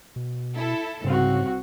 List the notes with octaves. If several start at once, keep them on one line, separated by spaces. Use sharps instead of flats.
B2
E4 A4
C2 G#2 C#3 C4 F#4